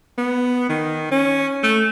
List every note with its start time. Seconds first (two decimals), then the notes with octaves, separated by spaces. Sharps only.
0.18 B3
0.69 D#3
1.11 C#4
1.63 A3